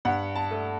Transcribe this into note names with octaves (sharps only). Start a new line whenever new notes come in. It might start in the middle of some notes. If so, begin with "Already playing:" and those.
G2 F#5
A5
A3